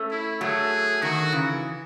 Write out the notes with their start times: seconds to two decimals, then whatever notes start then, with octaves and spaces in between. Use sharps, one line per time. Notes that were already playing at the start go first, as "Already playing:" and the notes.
Already playing: A3 C#4
0.11 E4
0.41 F#3 A3 G#4
1.02 D#3 F#3 F#4
1.32 C#3 E3